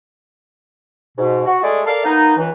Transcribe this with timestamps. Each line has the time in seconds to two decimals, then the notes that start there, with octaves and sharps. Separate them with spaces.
1.17 G#2 B2
1.46 F#4
1.63 G#3 A3 G#4 A4 D5
1.86 A4 A#4 D5 F5
2.05 A#3 B3 D#4
2.37 C#2 E3